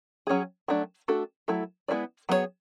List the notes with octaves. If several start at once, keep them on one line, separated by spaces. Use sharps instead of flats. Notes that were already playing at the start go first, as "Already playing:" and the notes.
F#3 C#4 G#4
F#3 A3 D4
A3 D4 F#4 A4
F#3 A3 E4 A4
G#3 B3 E4 B4 D5
F#3 B3 D4 G#4 C#5